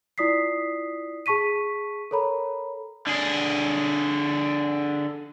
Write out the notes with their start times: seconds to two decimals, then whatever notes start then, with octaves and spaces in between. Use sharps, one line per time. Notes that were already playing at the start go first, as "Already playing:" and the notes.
0.18 E4 F4 D5 D#6 B6 C7
1.26 G#4 A5 C#6 B6 D#7
2.11 A4 A#4 C#5 A#5 B5
3.07 D3 G#4